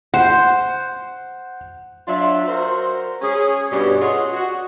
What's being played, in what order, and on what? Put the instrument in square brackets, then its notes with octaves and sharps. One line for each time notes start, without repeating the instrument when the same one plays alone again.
[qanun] C5 [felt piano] F#5
[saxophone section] F#3 D4 F4 E5
F#4 A#4 C5
C#4 G#4
G2 B2 G3 C#4
F4 G#4 C#5 D#5 F#5
F#4